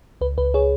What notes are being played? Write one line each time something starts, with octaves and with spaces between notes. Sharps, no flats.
C#2 B4
C#2 B4
G#4 C#5